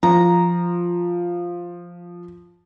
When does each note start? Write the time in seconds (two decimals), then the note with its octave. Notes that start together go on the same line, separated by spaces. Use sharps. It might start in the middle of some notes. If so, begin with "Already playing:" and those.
0.03 F3 A#5